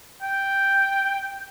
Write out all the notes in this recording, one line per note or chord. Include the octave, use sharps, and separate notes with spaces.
G5